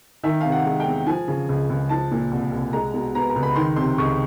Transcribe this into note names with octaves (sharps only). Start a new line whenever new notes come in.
D#3 E5
C3 F5
F#5
G#3
G5
E2
F3 G#5
C#3
C#2
C#2
F3 A5
A#2
C2
C2
G#3 A#5
B2
B3 A#5
A#5
C#2
B5
D#3 C6
C3 C6
C#2 C#6